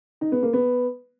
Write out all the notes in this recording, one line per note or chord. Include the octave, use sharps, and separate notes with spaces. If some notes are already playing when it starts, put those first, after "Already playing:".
D#4
B3
A#3
B3